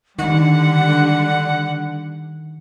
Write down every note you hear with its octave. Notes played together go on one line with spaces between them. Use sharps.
D3 D#3 G3 F#5